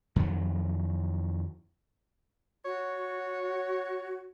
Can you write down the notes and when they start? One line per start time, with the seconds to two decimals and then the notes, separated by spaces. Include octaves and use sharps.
0.16 F2 D#3 F#3
2.65 F#4 C#5